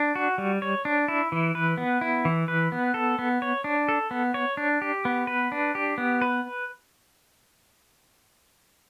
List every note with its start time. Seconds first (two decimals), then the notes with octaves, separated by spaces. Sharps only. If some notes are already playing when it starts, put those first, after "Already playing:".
Already playing: D4
0.16 F#4
0.38 G3
0.62 C#5
0.85 D4
1.08 E4
1.32 E3
1.55 B4
1.78 B3
2.01 E4
2.25 E3
2.48 B4
2.72 B3
2.94 A4
3.19 B3
3.42 C#5
3.64 D4
3.88 A4
4.11 B3
4.34 C#5
4.57 D4
4.82 G4
5.05 B3
5.27 B4
5.52 D4
5.75 G4
5.98 B3
6.22 B4